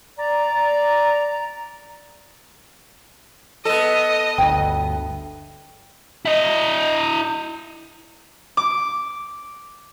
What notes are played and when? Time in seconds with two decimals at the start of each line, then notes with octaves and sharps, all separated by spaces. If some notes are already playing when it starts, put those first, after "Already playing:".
0.18 D5 A#5
3.65 B3 A4 D#5
4.38 G1 D2 G5
6.26 E4 D#5
8.57 D6